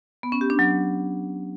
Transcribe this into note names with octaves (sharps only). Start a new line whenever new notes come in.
B3
C#4
G4
D4
F#3